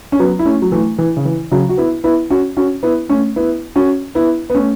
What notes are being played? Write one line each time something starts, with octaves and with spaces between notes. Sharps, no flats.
C#4
F#3 B3
E4
A3 C#4
F#3
E3 A3
E3
C#3
E3
C#3 F#3
F#4
B3 E4
B3 E4
C#4 F#4
C#4 F#4
B3 E4
A3 C#4
B3 E4
C#4 F#4
B3 E4
B3
A3 C#4